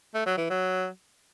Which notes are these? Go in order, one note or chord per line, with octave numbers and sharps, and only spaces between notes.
A3
F#3
E3
F#3